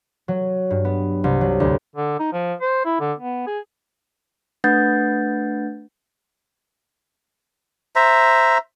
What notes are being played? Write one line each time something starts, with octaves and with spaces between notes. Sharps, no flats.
F#3
G2
B3
C2
F#3
D2
D3
D#4
F3
C5
E4
D3
B3
G#4
A3 D4 B4 F#5 G6 A6
C5 E5 A#5